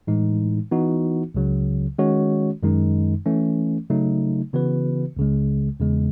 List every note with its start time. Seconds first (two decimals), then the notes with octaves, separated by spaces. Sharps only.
0.07 A2 E3 G#3 D#4
0.71 E3 B3 D#4 F#4
1.35 C#2 C#3 F#3
1.99 D#3 G#3 C#4 F#4 C#5
2.63 F#2 D#3 G#3 D#4
3.26 E3 A3 C#4
3.90 C#3 F#3 A3 D#4
4.53 C#3 E3 B3 F#4 B4
5.17 C#2 C#3 G#3
5.80 E2 C#3 G#3